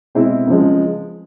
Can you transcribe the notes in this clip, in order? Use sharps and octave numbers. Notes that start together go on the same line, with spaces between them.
B2 G#3 C4 E4
C#2 C#3 F3 G#3